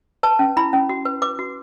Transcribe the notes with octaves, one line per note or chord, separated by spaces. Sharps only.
B4 A5
C#4
E4 B5
C#4
F#4
B4
B4 D6
F#4